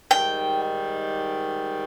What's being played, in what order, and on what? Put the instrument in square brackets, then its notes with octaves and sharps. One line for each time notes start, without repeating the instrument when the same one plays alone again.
[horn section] G#2 D#3 G3 [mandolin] G5